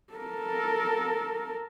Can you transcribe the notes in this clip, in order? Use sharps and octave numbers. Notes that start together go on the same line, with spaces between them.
A4 A#4